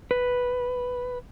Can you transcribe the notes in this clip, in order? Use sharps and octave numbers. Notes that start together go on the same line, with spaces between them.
B4